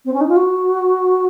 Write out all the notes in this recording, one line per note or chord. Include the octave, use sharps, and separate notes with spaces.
C4
C#4
D#4
F4
F#4